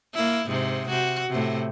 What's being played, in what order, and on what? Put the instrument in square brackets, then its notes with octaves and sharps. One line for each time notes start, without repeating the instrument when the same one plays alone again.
[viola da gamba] A#3 E4
G#2 C3
C3 F#4
A2 C3